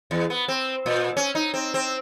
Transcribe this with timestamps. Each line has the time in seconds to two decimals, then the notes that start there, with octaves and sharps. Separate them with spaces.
0.11 E2
0.30 B3
0.48 C4
0.86 A#2
1.17 C#4
1.35 D#4
1.54 C4
1.74 C4